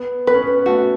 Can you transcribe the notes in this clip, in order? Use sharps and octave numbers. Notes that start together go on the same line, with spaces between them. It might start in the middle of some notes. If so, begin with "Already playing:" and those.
Already playing: B3
B3 B4
C#4
B3
A3 F#4